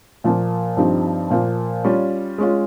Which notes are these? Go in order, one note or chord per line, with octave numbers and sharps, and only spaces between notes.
A#2 F3 A#3
G2 F3 C4 D#4 G4
A#2 F3 A#3
G3 C#4 F4
G#3 C#4 F4